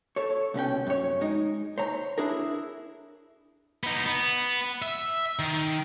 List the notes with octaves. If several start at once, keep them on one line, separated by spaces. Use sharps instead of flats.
A4 C#5
C2 B2 C#4 G5
F#2 C#5
G#3 D#4
C5 C#5 A#5
D4 E4 G#4 A#4
B3 D#4
B3
E5
D#3